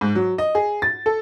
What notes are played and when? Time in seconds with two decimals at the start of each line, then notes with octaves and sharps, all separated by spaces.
0.01 G#2
0.15 F#3
0.38 D#5
0.55 G#4
0.82 A6
1.06 A4